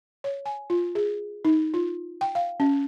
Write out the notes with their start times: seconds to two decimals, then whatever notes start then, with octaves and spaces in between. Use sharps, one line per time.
0.24 C#5
0.46 G#5
0.70 F4
0.95 G#4
1.45 D#4
1.74 F4
2.21 G5
2.35 F5
2.60 C#4